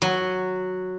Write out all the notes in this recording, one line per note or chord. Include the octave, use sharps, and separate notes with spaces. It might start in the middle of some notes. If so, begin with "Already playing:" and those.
F#3